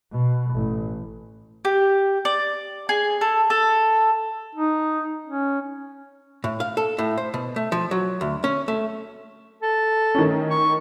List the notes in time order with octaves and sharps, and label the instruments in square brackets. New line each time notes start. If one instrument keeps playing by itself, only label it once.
[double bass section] B2
A1
[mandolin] G4
D5
G#4
A4
A4
[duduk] D#4
C#4
[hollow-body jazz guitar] A2
F5
A4
A2
C5
B2
A3
F3
F#3
D2
C#4
A3
[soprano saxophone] A4
[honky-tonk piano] D#3 A3 C#4
[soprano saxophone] C#6